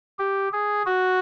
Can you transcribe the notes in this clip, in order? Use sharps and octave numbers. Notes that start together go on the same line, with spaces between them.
G4
G#4
F#4